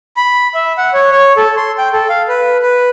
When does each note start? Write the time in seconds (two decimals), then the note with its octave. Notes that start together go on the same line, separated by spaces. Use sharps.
0.17 B5
0.55 E5
0.78 F#5
0.94 C#5
1.11 C#5
1.37 A4
1.57 C6
1.78 G5
1.93 A4
2.09 F5
2.28 B4
2.62 B4